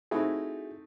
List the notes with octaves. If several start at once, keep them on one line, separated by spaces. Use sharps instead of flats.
A3 C4 D#4 E4 F#4 G#4